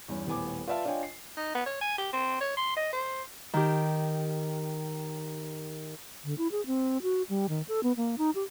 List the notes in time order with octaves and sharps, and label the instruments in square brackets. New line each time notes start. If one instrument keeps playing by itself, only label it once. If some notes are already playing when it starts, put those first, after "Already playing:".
[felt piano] E2 G2 C#4
D#1 A2 B3 G#5 D6
F4 B4 D5 E5 F5 A5
D4 F4 C#5 D#5 G5 G#5
C7
[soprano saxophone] D#4
B3
C#5
G#5
G4
C4
C#5
C6
D#5
C5
[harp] D#3 G4
[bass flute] D3
E4
G#4
C4
F#4
G3
D#3
A4
B3
A#3
D#4
G4